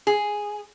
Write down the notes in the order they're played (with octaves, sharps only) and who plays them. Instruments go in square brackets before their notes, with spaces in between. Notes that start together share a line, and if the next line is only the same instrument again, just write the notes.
[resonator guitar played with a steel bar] G#4